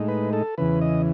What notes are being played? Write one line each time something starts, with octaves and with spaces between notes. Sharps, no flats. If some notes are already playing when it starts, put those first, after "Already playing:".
Already playing: A2 G#3 D#4
B4
A4
E2 C#3 E3 B4
D#5